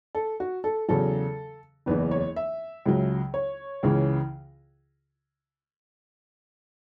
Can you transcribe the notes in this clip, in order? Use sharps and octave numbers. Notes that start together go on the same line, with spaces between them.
A4
F#4
A4
E2 C#3 F#3 A4
F#1 E2 E3 B4
C#5
E5
C#2 C#3 F#3
C#5
C#2 C#3 E3